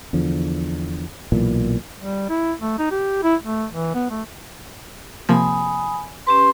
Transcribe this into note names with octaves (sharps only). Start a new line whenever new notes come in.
E2 D3 F3
B1 A#2 E3
G3
E4
A3
D#4
G4
E4
A3
E3
B3
A3
C3 F3 A#3 G#5 B5 D#6
C#4 G4 B4 C6